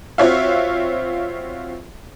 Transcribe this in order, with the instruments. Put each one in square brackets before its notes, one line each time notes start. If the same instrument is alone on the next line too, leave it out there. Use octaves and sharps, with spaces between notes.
[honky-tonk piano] C4 F4 F#4 C#5 E5 F5